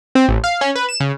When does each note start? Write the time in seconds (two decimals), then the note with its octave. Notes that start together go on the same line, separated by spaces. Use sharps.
0.15 C4
0.29 A1
0.44 F5
0.61 C#4
0.76 B4
0.89 E7
1.00 C#3